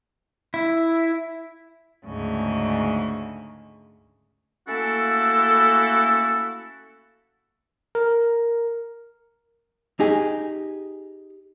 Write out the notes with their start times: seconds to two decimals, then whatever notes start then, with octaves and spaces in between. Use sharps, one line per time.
0.54 E4
2.04 D2 G#2 C#3
4.67 A3 A#3 C#4 E4 F#4 A4
7.95 A#4
10.00 D#4 G4 G#4